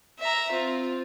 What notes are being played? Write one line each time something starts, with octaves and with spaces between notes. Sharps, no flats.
E5 A#5
C4 F4